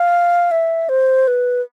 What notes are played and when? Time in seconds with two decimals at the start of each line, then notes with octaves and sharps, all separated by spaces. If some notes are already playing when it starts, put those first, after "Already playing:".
Already playing: F5
0.51 E5
0.89 C5
1.28 B4